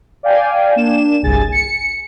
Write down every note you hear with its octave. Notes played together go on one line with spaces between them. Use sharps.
D5 F5 G5 G#5
A#3 D4 E7
G1 C2 G#4 G#5 A6
C#7